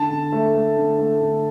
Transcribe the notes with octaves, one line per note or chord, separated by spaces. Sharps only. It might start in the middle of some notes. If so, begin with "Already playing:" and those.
Already playing: D3 A5
D3
A3
A3
D3
A3
D3